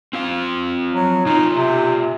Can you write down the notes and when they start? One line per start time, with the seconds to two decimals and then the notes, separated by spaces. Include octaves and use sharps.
0.13 C4 F4 F5
0.94 F#3
1.25 B2 D#4 F4
1.54 C3